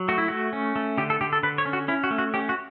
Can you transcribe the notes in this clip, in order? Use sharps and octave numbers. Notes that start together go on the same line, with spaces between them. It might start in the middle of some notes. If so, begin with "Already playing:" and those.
Already playing: F#3
A3 F#4
E4
A3 F#4
C#4
A3
D3 G4
A4
D3 G4
A4
D3 B4
C#5
C#4
F#4
C#4 E4
F#4
A3
F#4
C#4 G4
F#4